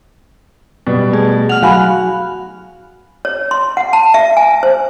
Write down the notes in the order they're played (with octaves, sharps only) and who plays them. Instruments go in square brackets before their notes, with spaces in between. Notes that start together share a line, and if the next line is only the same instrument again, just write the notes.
[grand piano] B2 G3
[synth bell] A3 G#4
[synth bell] F#5 F6 [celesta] F7
[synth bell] F#3 F#6 [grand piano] F#4 [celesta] F5 G#5 B5
[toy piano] C#5
C6
F#5
A5
E5
G#5
C5